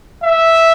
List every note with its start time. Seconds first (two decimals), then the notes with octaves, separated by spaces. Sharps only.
0.24 E5